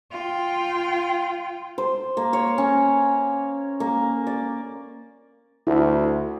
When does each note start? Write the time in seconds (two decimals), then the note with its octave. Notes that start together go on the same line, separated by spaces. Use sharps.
0.11 F4 G5
1.78 C5
2.17 A#3
2.33 C#5
2.58 C#4
3.80 A#3
4.27 D5
5.67 D2 E4